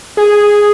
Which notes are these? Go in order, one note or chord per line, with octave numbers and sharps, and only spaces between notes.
G#4